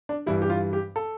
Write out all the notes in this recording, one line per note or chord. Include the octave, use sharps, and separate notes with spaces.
D4
G2 E3 G3 E4
G4
F4
G4
A4